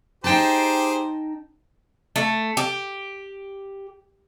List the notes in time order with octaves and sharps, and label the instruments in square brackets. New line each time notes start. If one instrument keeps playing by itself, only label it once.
[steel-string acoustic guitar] D#4 G5 A5 [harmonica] G4 G#4 C5
[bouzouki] A3
G4